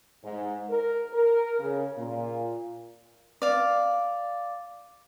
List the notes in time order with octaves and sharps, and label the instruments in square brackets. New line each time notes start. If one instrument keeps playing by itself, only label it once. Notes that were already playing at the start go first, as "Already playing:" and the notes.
[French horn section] G#2
A#4
A#4
C#3
A#2
[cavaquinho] D5 F5